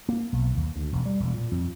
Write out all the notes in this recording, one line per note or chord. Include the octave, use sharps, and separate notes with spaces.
A#3
B1
D#2
D2
E1
G3
E1
A#2
F2